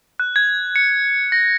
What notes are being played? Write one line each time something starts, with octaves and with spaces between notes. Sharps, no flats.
F#6
G#6
C#7
A#6